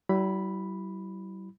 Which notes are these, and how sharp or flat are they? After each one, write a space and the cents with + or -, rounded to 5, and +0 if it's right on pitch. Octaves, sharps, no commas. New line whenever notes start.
G3 -45 E4 +0 B5 +0